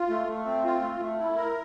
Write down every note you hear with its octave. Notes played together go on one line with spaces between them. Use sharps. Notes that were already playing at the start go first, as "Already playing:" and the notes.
Already playing: F4
A3
A3
C4
F4
A3
A3
E4
A#4